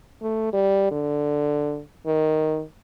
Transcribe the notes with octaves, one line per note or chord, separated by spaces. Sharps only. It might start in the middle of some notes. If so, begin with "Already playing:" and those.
A3
G3
D3
D#3